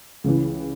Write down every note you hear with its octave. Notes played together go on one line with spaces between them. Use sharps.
C#2 C#3 E3